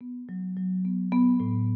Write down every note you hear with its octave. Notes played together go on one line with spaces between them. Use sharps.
B3
F#3
F#3
B3
B3
A2